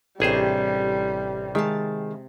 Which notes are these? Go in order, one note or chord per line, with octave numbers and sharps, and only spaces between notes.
A1 C3 G3 D4 G#4 C5 C#6
D#3 G#3 E5 F5 A5